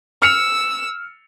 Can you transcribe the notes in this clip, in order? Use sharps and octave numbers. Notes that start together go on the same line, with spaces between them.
E6 F6 C#7 F7